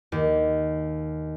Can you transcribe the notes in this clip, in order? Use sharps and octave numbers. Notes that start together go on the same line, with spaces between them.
D#2